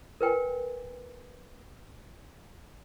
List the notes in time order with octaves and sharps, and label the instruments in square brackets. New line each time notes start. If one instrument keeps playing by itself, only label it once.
[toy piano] A#4 B4 G5 G#5